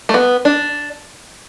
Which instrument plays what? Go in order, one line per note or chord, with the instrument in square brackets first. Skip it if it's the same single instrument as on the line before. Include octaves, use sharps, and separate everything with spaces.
[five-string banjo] A3
B3
D4